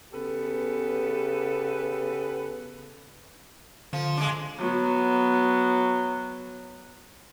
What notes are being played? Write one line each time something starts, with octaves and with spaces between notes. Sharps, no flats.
C#3 B3 G4 A4 B4
D3 F3
G#3 D4
F#3 B3